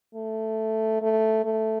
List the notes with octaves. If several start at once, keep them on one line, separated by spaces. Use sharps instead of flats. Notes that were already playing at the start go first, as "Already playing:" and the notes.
A3
A3
A3